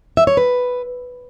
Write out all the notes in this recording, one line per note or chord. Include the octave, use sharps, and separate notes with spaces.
E5
C#5
B4